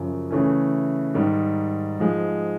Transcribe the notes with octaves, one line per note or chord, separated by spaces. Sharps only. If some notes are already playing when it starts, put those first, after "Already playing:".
Already playing: F#2 C#3 F3
C#3 E3 A3 C#4
G#2 D#3 G3
G#2 F3 G#3